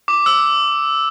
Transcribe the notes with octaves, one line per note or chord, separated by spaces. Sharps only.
D6
E6